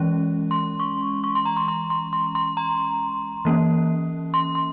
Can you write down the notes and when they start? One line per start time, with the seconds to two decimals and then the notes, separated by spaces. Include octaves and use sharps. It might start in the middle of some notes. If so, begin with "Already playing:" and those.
Already playing: E3 G#3 C#4
0.51 C6
0.80 C#6
1.24 C#6
1.35 C6
1.45 A#5
1.57 C6
1.68 C6
1.90 C6
2.13 C6
2.35 C6
2.57 A#5
3.45 E3 A#3 C#4
4.34 C6
4.55 C6